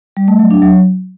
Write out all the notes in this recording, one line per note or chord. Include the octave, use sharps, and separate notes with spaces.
G3
A3
F#3
D4
F#3